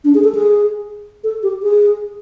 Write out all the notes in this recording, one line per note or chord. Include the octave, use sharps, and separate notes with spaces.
D4
G#4
A4
G#4
A4
G4
G#4